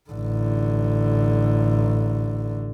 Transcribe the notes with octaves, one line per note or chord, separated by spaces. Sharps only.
A1 D3